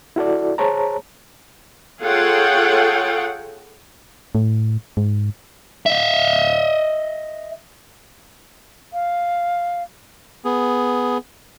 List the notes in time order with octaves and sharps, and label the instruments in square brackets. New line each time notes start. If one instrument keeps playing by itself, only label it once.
[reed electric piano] E4 F#4 A4 D5
G#4 C5 C#5 A5 A#5
[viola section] F4 G#4 A4 C#5 F#5 G5
[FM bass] A2
G#2
[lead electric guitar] D#5 E5
[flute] F5
[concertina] B3 G#4